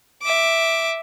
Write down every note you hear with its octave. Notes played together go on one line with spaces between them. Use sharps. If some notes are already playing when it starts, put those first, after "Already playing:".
E5 D6